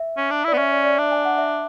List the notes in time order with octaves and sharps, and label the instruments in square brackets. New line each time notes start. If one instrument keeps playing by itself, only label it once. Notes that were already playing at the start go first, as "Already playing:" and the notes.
Already playing: [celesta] E5
[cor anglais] C#4
D4
[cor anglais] E4 [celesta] D5
[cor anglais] B3
[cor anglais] C#4 [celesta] E5
[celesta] D5
D5
[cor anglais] D4 [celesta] E5
[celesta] G#5
F#5
E5